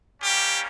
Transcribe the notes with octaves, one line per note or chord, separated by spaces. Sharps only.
G3 A#3 C#4 G4